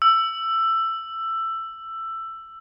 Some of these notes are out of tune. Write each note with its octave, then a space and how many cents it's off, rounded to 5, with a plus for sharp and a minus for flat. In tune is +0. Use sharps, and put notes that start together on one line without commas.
E6 +15